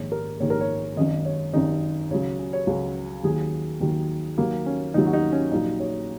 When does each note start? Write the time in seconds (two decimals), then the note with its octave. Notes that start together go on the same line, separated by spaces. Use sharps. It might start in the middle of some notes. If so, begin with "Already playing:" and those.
Already playing: A#1 G#2 D#3 C#5
0.12 A#4
0.40 A#1 G#2 D#3 C#5
0.50 A#4
0.61 C#5
0.96 G#1 F#2 D#3 D#5
1.25 C#5
1.53 G#1 F#2 D#3 D#4
2.10 C#2 C#3 F#3 C#5
2.39 C#4
2.53 C#5
2.67 C#2 C#3 F#3
3.24 D#2 D#3 F#3 G#4
3.80 D#2 D#3 F#3
4.38 D#2 D#3 F#3 A#3
4.66 C#4
4.94 D#2 D#3 F#3 D#4
5.06 F#4
5.13 D#4
5.32 C#4
5.52 A#1 A#2 F#3 D#4
5.80 C#5